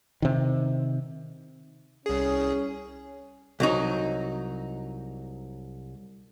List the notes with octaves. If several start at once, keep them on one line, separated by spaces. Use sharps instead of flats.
C3 D#3
C2 C#4 G#4
C2 F#3 D#4